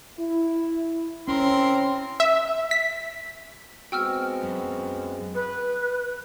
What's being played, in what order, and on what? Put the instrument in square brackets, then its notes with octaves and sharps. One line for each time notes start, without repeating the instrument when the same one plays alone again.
[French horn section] E4
[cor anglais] C4 [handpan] C#4 [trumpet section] E4 A#4 C6
[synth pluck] E5
B6
[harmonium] G#3 B3 C4 [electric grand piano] F#4 [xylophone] G5 E6 F6
[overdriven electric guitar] F#2
[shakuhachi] B4